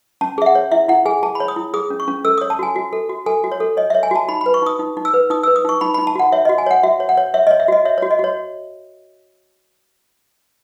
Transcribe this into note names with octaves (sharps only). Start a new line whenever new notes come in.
C#4 A5
G#4 E5
F#5
C#5
E4 E5
E4 F#5
G#4 G#5
G#4 A5
B5
C#5
D#6
E4
G#4 D#6
C#4
C#6
C#4
A4 E6
C#5 D#6
A5
F#4 G#5
F#4
A4
F#4
A4 G#5
F#4
C#5
A4
C#5 D#5
C#5 E5
G#5
F#4 A5
D#4 B5
B4 B5
C#6
D#4 D#6
D#4
D#4
E6
B4
D#4 D#6
B4 E6
D#6
D#4 C#6
D#4 B5
D#4 B5
A5
F#4 F#5
C#5 E5
F#4 D#5
G#5
C#5 F#5
F#4 E5
C#5
F#5
C#5
C#5 E5
C#5 D#5
E5
F#4 D#5
C#5 E5
F#4 C#5
D#5
F#4 C#5